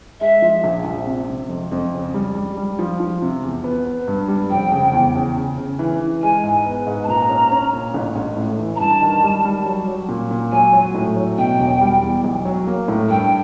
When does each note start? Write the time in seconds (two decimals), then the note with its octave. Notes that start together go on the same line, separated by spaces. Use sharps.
0.20 G#3 E5
0.42 F3
0.64 A#1
0.85 A#1
1.07 C3
1.29 C3
1.49 F2
1.72 F2
1.93 C#3
2.14 G3
2.35 G3
2.57 G3
2.79 F3
3.00 F3
3.22 C3
3.43 E2
3.64 B3
3.86 B3
4.08 G2
4.28 G3
4.50 F1 G5
4.71 C#3
4.93 E2
5.15 C#3
5.36 C#3
5.58 C#3
5.79 E3
6.01 E3
6.22 G#3 G#5
6.44 G#2
6.65 B3
6.87 G#2
7.04 A5
7.08 A#2 A#5
7.29 C#4
7.52 C#4
7.73 A#2
7.94 A1
8.16 A1
8.37 A2
8.59 E3
8.76 A#5
8.80 G2 A5
9.01 D#3
9.23 G3
9.45 G3
9.66 F#3
9.88 F#3
10.09 A#2
10.31 A#2
10.52 F#3 G#5
10.73 F#3
10.94 A2
11.17 F#3
11.38 B2 G5
11.60 E1
11.81 G3
12.03 E2
12.24 B1
12.45 F#3
12.67 A#3
12.88 A2
13.09 G2 G5